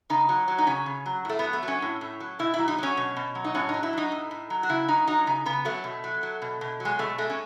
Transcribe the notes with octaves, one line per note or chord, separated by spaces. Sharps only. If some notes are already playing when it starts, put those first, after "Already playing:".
C#3 D#4
F#3
F#3
D#4
C#3 C#4
C#3
F#3
A2 A3
F#3 B3
A3
F#3 C#4
A2
A2
F#3
B2 E4
E4
F#3
D#4
F#3 C#4
B2
B2
F#3
D#4
A2 C#4
D#4
F#3
E4
F#3 D#4
A2
A2
F#3
F#4
C#3 E4
F#3 D#4
F#3 D#4
C#3 D#4
C#3 B3
F#3 A3
B2
F#3
F#3
B2
B2
F#3
G#3
B2 A3
G#3 A3
C#4